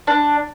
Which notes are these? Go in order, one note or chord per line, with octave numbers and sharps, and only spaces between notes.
D4